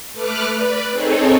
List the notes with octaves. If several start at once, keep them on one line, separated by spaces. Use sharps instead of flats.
A3 B4 D6 F6 F#6
B4 D5
C4 D#4 G#4 A4 C#5